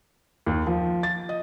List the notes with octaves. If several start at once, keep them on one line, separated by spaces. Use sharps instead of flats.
D#2
F3
A6
D#5